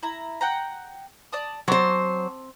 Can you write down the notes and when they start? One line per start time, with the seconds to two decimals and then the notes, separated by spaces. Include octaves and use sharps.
0.03 E4 A#5
0.41 F#5 G5 A#5
1.32 D5 A5 D#6
1.68 F#3 C4 C5 A5 D6